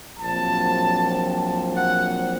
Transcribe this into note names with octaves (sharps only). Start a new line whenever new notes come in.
A#1 A#2 F#3 C4 A5
F#5